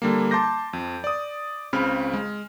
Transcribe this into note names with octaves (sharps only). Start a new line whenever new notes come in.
D3 G3 A#3
A5 C6 D6 G6 A#6
F2
D5 D#6
C#2 C#3 C4 B5 F6
G#3